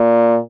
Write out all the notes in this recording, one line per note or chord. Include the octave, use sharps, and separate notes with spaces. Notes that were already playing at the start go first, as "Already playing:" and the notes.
Already playing: A#2